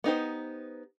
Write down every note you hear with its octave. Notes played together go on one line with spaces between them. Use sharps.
B3 D#4 G4 C5